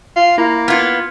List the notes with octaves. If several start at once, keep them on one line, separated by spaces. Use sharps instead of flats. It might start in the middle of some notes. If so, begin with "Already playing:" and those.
F4
A#3 E4 A#5
B3 F4 F6 G#6 C#7